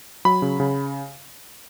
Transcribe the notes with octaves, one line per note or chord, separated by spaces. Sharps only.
F#3 B5
C#3
C#3